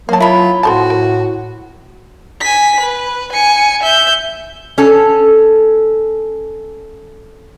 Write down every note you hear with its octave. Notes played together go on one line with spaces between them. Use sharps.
F#3 A#3 F5 A5
E4 F4 B5
A2 C4 F#4 A4 A5
A#4
G#5 B6
B4
G#5 C#7
E5 G6
C#4 A4